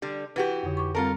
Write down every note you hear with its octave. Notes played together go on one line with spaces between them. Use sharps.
D3 G3
E3 F#4 G4 B4
F2 D3
C#6 D6
G3 C4 F4 A4 A#4 A5